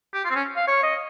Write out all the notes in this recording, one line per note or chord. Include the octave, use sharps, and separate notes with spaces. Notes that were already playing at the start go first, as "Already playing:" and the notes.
G4
F4
C4
C#4
F5
C#5
D#5